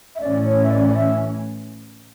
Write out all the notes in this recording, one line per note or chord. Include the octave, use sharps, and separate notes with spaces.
E5
A2 E3 A3 C#4 D5
C#5
E5
D5
D5
E5